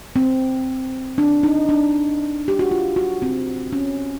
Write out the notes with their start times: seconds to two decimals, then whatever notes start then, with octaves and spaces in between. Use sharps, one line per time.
0.16 C4
1.18 D4
1.43 D#4
1.69 D4
2.48 G4
2.59 F#4
2.71 F4
2.96 F#4
3.22 C4
3.73 C#4